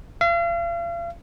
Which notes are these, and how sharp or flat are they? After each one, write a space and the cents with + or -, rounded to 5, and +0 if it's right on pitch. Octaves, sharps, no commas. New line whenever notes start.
F5 -40